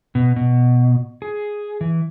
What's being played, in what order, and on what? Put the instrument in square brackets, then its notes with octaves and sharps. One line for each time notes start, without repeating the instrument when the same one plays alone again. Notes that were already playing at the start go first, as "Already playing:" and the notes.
[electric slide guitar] B2
B2
G#4
E3